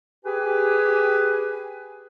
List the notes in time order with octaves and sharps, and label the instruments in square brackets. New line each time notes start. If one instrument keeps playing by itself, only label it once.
[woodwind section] G4 G#4 B4 G#5